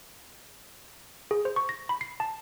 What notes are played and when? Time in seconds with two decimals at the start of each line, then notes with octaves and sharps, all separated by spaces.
1.31 G#4
1.45 C5
1.56 C#6
1.69 A#6
1.89 B5
2.01 C7
2.20 A5